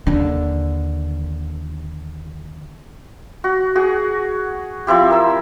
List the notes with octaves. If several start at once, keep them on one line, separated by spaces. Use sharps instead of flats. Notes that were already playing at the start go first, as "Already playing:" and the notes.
D#2 D3
F#4
F#4 G#4
F3 C4 E4 G4
A#4 E6